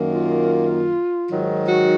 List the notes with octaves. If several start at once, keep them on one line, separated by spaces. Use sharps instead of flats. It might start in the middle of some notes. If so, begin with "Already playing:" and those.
Already playing: F#2 D#3 A#3
F4
G#2 D#3 F#3
F#4